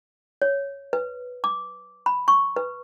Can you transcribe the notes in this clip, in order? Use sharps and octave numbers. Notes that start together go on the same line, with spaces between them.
C#5
B4
D6
B5
C#6
B4